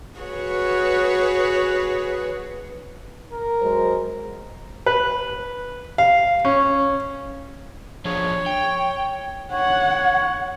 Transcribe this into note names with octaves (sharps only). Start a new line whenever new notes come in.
F#4 G#4 B4 C#5
A#4
F#3 G#3 C5
B4
F5
C#4
F3 D4 G#4 C#5
G5
C#5 F#5